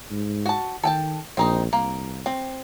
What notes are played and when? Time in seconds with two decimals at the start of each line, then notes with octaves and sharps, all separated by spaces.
0.11 G#2
0.46 F#4 A5
0.83 D#3 A4 G5 A5
1.37 A#1 C4 D#4 D#5
1.73 C2 A#3
2.26 C4